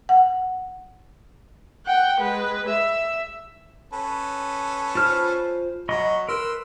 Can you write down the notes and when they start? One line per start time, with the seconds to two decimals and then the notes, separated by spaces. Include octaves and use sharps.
0.09 F#5
1.86 F#5 G5
2.20 G#3 B4
2.69 E5
3.93 C#4 A4 B4
4.95 F4 C5 F6
5.89 F#3 D#5 B5 C#6
6.29 A#4 B4 C6 E6